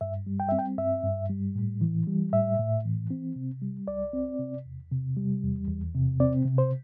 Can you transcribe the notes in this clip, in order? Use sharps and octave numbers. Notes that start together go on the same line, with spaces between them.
G2 E5
G3
G5
C4 E5
G5
G2 E5
G2
G3
A2
E3
G3
A2 E5
A2
E3
C4
C3
G3
C2 D5
C4
C3
E2
C3
G3
E2
E2
C3
C4 D5
C3
C5